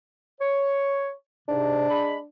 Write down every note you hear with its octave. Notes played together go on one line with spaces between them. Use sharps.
C#5
G#2 C3 D4
G#3 B5